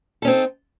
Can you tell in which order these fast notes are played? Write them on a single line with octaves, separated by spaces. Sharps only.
A4 C#4 C4 D#4